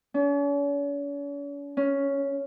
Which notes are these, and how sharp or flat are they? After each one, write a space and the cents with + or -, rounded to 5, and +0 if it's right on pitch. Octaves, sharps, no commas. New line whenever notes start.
C#4 +45
C#4 +5